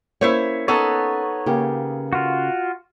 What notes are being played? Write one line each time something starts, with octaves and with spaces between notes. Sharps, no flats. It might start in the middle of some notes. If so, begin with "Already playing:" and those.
A#3 C#4 E4 C5 C#5
B3 D#4 A4 C#5
C#3 A#3 G4
F4 F#4